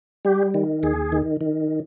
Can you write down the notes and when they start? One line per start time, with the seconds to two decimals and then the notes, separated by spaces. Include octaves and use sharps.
0.25 G3 G4
0.54 D#3
0.83 D#2 G#4
1.12 D#3
1.41 D#3